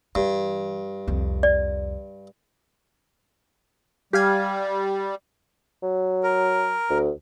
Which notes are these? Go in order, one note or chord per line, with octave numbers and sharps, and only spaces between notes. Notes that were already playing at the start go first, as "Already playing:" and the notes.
G2 E3
C2 F2
D5
G3 G4 F5 G#5
F#3
A#4
D2